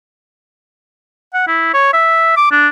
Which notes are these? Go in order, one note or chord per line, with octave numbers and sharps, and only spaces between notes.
F#5
E4
C#5
E5
D6
D4